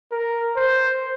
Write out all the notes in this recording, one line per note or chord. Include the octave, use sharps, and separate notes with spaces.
A#4
C5